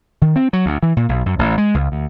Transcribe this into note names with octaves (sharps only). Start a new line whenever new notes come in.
D#3
C4
F#3
D2
E3
A#2
B1
F#2
A1
G#3
C#2
D2